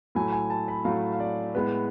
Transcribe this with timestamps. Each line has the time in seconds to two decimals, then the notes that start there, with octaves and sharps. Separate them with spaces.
0.15 A2 F#3 A3 G#5
0.32 G#5
0.50 A5
0.68 B5
0.85 A2 F#3 A3 F5
1.13 F5
1.20 D5
1.54 A2 G#3 B3 B4